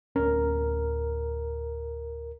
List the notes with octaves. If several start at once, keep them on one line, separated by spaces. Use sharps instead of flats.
D1 C#4 A#4